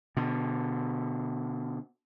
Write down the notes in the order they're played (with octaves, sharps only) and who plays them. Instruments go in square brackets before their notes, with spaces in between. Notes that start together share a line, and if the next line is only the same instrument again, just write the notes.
[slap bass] B2 D3